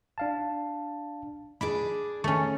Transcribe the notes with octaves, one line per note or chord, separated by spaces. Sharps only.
D4 F5 A5
D4 G#4 D5 B5
D#3 A3 C#4 C#6